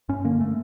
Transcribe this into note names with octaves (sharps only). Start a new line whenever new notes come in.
G2 C#4
D3 A#3
A3